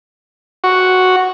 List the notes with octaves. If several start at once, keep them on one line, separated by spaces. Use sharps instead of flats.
F#4